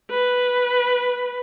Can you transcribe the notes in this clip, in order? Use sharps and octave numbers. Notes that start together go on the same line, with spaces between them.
B4